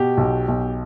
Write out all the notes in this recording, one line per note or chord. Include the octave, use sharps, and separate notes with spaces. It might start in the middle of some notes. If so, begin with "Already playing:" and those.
Already playing: B2 G4
B1
B1